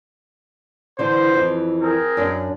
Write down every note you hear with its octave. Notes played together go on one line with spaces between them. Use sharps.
D3 E3 C5
F2 E3
C4 G#4 A#4
F#2 D4